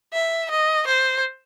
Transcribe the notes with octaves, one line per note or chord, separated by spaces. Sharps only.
E5
D#5
C5